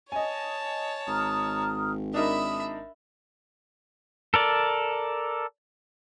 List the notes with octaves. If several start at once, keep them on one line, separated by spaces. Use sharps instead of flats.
C#5 D#5 G#5 A5
G#1 A#5 D#6 F6
D4 D#4 A#4 E5 B5 D#6
A4 A#4 D5